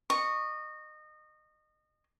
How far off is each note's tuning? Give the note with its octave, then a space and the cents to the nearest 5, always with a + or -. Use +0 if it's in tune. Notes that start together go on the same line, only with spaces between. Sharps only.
D#5 -25 C#6 +0